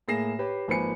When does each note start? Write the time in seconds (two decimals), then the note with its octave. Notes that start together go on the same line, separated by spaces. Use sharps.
0.08 A2 A#3 G#4 A#6 C7 E7
0.39 G4 B4 C#5
0.68 G#1 F3 A#3 B4 G#5 C#7